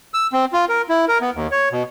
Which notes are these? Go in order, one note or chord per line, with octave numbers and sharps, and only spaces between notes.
E6
C4
F4
A#4
E4
A#4
B3
D#2
C#5
B2